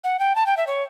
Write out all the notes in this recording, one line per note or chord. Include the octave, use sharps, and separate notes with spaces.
F#5
G5
A5
G5
E5
C#5